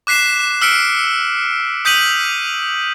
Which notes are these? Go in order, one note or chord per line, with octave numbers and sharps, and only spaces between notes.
D6 F#6 B6 C7 E7
E6 F6 B6 C#7 D7
D#6 G6 B6 D#7 F#7